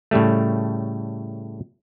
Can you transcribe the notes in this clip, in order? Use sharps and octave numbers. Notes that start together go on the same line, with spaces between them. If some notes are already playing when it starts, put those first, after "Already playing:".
A2 C#3 G3 A3